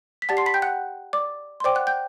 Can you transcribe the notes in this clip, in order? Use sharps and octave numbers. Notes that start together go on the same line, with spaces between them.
B6
G4 D5 F#5 A5 A6
C6 C7
B5 B6
G5 G6
F#5 F#6
D5 D6
C6
C5 D5 G5 D6
F#5 F#6
G5 G6